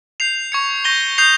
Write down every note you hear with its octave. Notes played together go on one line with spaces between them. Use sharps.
G6 C7 F7
C#6 G#6 C#7
C#6 G6 A#6 D#7 G7
D#6 G6 C7 F7